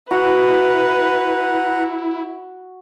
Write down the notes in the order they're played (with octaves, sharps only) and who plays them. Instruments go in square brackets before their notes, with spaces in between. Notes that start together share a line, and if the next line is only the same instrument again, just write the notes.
[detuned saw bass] E4 [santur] F#4 [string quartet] B4 [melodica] F#5 A#5